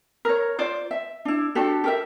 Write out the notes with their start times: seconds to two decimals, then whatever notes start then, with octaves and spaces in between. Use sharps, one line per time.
0.25 A#4 C#5
0.58 F4 C5 D5
0.91 E5
1.25 D4 E4
1.55 D4 F#4 G4 A4
1.84 G4 A#4 E5